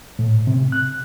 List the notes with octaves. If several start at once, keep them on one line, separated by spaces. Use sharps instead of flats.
A2
C3
F#6